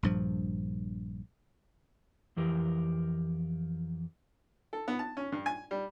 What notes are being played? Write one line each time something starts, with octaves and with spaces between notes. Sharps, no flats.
A#1 G2 F3
F2 E3 G4 A#4
A4
B3
A5
C#4
G2
G#5
G3